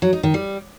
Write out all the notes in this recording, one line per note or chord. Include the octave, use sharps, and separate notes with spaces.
F#3
D#4
D#3
G3